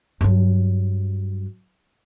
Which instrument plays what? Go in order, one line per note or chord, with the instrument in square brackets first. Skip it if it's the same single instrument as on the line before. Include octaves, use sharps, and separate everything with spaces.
[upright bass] G2 F#3